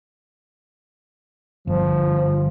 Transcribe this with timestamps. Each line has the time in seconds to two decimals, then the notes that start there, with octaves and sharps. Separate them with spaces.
1.67 G1 F3